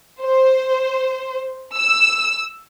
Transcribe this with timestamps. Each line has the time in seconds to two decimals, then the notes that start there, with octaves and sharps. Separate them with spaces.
0.22 C5
1.74 E6